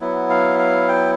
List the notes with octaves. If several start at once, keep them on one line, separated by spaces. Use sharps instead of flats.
F#3 B3 E4
F5
F5
G5